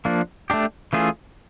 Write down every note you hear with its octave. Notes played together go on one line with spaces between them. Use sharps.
F3 A#3 D4
A3 D4 G4
E3 A3 C#4 F4 G#4